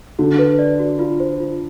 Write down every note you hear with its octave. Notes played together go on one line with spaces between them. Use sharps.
D3 F#4
B4
D5
F#4
F4
C5
F4